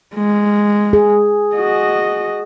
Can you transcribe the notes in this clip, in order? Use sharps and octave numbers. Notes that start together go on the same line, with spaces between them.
G#3
G#4
F#4 D#5